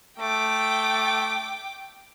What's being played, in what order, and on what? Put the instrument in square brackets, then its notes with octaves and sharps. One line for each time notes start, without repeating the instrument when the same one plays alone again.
[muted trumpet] A3 [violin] G5 D6